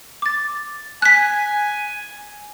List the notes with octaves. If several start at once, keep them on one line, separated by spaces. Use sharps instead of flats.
D6 A6
G#5 F#6 B6